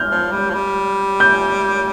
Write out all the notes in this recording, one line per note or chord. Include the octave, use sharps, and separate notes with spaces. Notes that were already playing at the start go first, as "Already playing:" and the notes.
Already playing: F6 G6
F3
G3
F3
G3
G6